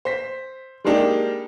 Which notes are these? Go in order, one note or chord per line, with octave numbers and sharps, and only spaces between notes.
C5 B6
G3 G#3 A#3 D4 D#4 G4